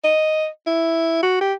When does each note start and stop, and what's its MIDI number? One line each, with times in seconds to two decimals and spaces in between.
0.04 0.47 75
0.67 1.18 64
1.23 1.39 66
1.41 1.53 67